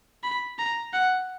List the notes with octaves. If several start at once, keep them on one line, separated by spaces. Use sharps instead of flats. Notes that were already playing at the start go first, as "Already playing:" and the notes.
B5
A#5
F#5